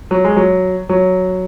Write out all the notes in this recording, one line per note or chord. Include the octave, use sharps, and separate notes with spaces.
F#3
G#3
F#3
F#3